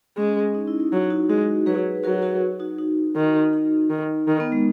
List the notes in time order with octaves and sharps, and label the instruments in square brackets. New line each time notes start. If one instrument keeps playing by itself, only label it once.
[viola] G#3 [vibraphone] C#4
[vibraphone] D#4
E4
E4
[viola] F#3 [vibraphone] D#4
[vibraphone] D#4 F#4
[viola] G#3 [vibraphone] D#4 F#4
[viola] F#3 [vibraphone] G#4 B4
[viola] F#3 [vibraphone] F#4 A#4
[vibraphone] F#4 A#4
D#4 F#4
D#4 F#4
[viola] D#3
[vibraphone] D#4
[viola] D#3
D#3
[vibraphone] B3
G#3